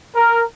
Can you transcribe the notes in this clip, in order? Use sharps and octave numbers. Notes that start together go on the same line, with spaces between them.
A#4